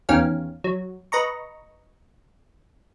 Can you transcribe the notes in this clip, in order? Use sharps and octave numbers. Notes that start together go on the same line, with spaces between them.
E2 D#3 C#4 G4 F5
F#3
B4 D#5 A#5 C#6